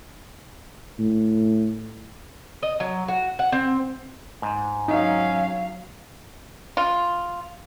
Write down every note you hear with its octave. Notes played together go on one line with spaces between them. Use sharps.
A2
D#5
F#3
F#4
F#5
C4
G#2
F#3 C#4 D#4 F5
F4